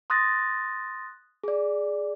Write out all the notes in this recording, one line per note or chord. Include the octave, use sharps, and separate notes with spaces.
C6 D#6 F#6 A6 A#6
G#4 D5